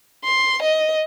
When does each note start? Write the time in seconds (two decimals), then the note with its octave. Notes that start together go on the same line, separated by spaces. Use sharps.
0.25 C6
0.62 D#5